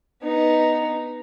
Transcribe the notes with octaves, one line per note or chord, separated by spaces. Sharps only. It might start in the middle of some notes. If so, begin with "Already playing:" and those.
B3 D#4